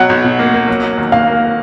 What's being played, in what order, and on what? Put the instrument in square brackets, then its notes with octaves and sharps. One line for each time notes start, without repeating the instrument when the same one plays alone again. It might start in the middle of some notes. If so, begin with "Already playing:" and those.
Already playing: [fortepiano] B2 F#3 [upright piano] F#5
[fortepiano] B1
B2
A#3
A#3
F#3
F#3
D#2
[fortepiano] A#3 [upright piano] F5
[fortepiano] A#3